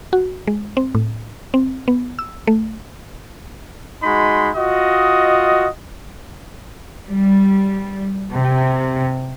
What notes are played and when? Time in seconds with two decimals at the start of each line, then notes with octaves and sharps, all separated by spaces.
0.13 F#4
0.47 G#3
0.77 C4
0.95 A2
1.54 C4
1.88 B3
2.19 E6
2.47 A3
4.03 G#3 D#4 F#4 B5 C6
4.56 F4 F#4 D#5
7.08 G3
8.34 C3